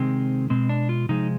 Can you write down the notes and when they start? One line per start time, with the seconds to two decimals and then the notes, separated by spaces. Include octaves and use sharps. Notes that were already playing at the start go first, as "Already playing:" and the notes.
Already playing: C3 D#3 G#3 C4
0.50 B2 G#3 C4
0.69 D4
0.89 F4
1.09 C3 F3 G#3 D#4